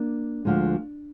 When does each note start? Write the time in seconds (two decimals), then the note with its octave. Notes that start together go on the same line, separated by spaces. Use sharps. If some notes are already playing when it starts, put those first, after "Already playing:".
Already playing: A#3 D4
0.45 D2 D3 F3 G#3